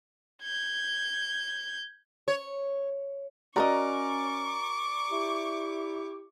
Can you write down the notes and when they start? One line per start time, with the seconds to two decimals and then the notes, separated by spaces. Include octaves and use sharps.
0.43 G6 G#6
2.28 C#5
3.56 C#4 F#4 A#4 D5 D#5 A#5 C#6 D6
5.11 E4 G4